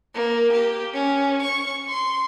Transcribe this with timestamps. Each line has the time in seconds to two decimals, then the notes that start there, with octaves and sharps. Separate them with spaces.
0.15 A#3
0.53 G4
0.94 C#4
1.43 C#6
1.88 C6